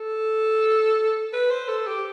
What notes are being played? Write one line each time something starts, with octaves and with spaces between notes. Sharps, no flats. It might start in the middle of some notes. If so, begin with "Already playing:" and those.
Already playing: A4
B4
C5
A4
G4